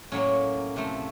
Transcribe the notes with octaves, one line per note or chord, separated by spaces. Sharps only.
A2 F#3 A#3 C#4
C3 F3 A3